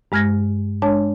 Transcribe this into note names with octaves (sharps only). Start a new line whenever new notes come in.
G2 G#3 F6 G#6 A#6
G#3 D4 C#5 A5